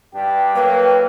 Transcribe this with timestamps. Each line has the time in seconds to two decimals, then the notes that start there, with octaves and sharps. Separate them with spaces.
0.14 G2 D4 G4 G5
0.55 F#3 A3 A#3 B4